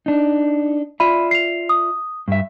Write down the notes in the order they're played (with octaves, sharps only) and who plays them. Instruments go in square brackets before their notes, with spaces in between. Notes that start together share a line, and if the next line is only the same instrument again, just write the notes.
[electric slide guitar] D4 D#4
[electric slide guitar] F4 D5 E5 [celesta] B5 D#7
[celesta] C7 F7
D#6
[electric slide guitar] G2 E5